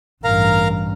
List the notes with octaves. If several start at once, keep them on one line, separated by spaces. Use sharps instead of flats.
A1 G2 A#4 F5 A#5